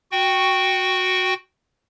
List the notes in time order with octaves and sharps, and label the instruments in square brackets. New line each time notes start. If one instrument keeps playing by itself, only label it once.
[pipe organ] F#4 G5 C#6